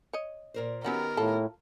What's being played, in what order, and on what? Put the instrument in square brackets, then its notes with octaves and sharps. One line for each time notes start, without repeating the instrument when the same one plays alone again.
[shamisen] C#5 D#5
[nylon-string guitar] A#2 A#4 C5
[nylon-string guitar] D#3 B3 G4 [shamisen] F#3 C#4 F#4 [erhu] A#4
[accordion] A2 [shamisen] F4 A4